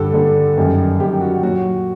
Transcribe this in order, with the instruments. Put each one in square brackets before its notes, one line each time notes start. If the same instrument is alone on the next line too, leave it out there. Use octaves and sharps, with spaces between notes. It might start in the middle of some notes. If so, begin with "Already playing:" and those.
Already playing: [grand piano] G2 D3 G3 A4
G2 D3 G3
F#2 D#3 G3
F#2 D#3 G3 G4
F#4
A#2 F#3 F#4